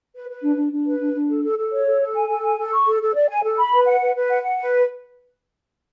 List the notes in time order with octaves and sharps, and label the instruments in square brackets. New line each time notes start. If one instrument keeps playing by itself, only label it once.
[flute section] B4
B4
D4
D4
D4
B4
D4
D4
A4
A4
A4
C#5
A4
A4
G#5
A4
G#5
A4
C#6
A4
A4
D5
G#5
A4
B5
B4
F#5
B4
B4
F#5
F#5
B4